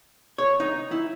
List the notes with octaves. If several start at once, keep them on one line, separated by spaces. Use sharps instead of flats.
C#5
D#4
E4